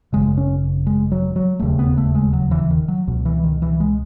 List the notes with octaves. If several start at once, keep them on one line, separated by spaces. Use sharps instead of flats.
G#1 F#2 C#3 G#3
C#4
G#3
F#3
F#3
E1 D#2 C#3 A3
B3
A3
G#3
F#3
E3
D#3
F#3
C#2 B2
E3
D#3
E3
G#3